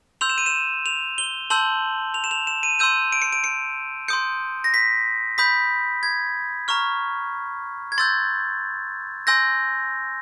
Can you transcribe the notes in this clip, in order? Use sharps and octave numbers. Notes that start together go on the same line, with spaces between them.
C6 E6 G6 F7
E7
D#7
E7
F7
G7
A5 C6 E6 G6 F#7
F7
E7
F7
E7
D#7
C6 E6 G6 D#7
D7
C#7
D7
C#7
C6 D#6 G6 C#7
A#6
B6
B5 D#6 G6 B6
G#6
A#5 C#6 F6
G#6
C6 E6 G6 A6
G#5 C6 E6 G6 A#6